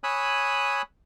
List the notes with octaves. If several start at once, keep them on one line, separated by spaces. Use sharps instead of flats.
C#5 G#5 B5 D#6 E6 F#6